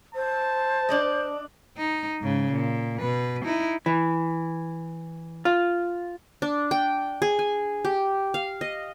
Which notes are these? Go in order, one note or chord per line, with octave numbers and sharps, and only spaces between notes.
C5 A5
D4 D5 D#5
D#4
G#2 C#3
A#2
B2 B4
D#4 E4
E3
F4
D4
G5
G#4
G#5
G4
F5
D#5